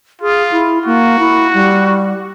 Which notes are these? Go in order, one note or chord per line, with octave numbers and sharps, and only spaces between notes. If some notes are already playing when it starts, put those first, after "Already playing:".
F4 G#4
E4
A#3 F#4
E4
G3